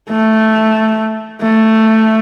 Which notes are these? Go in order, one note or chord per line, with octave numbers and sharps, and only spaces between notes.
A3
A3